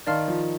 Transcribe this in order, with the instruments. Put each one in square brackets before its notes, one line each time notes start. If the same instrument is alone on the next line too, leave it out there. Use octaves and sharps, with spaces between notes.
[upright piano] D#3 [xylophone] D5 F5 A5 C6 F6
[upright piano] F3